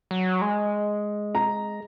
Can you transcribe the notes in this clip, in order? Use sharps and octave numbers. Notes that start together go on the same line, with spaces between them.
F#3
G#3
A#5